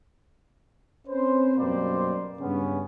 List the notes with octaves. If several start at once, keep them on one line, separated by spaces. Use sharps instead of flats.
C4 C#4 B4 C5
F#2 B2 G3 A#3 C5 D5
G2 C#3 B3 C#4